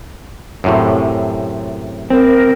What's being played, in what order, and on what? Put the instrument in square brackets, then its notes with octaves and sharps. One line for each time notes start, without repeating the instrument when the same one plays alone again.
[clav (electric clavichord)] F#2 A2 C3
[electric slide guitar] C4 [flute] A#4